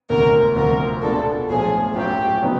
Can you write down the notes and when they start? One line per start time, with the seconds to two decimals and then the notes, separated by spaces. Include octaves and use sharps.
0.10 E1 D2 C3 A#4
0.56 D2 C3 F3 A#4
1.03 B2 G#3 B3 D4 F4 A4
1.50 B1 A2 F3 G#4
1.96 A2 F#3 A3 C#4 F4 G4
2.42 C#3 F#3 B3 D#4